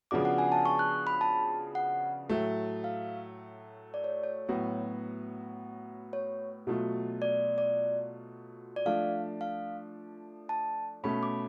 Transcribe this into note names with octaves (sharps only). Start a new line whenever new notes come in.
C#3 F3 B3 D4 F#4 D6
F#5
G#5
A5
C#6
F#6
B5
A5
F#5
A2 F#3 A3
F5
D5
C#5
C#5
A2 F#3 B3 F#4
C#5
B2 F#3 A3 F4
D5
D5
D5
F3 A3 D4 F5
F5
A5
B2 A3 C#4 B5
D6